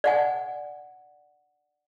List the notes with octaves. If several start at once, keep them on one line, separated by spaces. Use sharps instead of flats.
D5 F#5 G#5